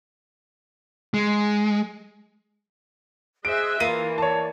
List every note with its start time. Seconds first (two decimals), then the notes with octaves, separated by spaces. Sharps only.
1.14 G#3
3.45 G#4 C5 D#5 E5 F#6 D7
3.80 E3 A#3 F4 D#7
4.18 C#5 D5 A5